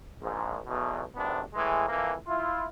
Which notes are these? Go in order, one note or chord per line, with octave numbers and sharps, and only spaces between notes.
A#1 G#2
B1 E2 B2
G#1 C3 B3 D4
A2 E3 G#3
F2 E3 A#3
E4 F4